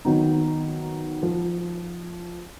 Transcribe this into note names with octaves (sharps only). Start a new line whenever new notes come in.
D#3 F#3 B3 D#4
F3